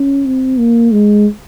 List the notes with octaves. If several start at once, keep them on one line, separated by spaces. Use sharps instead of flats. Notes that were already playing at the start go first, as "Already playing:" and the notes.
Already playing: C#4
C4
A#3
G#3